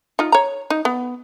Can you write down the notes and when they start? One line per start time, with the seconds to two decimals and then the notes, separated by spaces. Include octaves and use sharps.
0.19 D#4 F4
0.32 C#5 A#5
0.70 D#4
0.85 B3